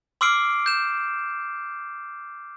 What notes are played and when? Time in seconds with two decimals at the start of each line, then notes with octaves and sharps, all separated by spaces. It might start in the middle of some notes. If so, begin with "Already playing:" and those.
0.21 C6 D6 E6 F6 C7 D7
0.66 G6 E7